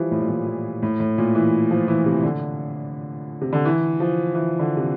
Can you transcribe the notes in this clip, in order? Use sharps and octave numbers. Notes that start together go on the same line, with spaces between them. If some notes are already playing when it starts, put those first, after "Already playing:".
Already playing: E3 F3 G3
A2
A#2
A2
A#2
A2
A2
A#2
E3
F3
E3
C3
D3
C3
D3
E3
F3
E3
D3
C3